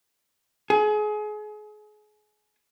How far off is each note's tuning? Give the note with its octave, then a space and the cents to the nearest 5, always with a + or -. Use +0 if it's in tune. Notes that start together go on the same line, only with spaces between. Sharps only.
G#4 +30